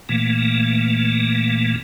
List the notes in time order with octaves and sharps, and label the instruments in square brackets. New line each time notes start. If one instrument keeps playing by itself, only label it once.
[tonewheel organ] A#2 E3 A3 A#3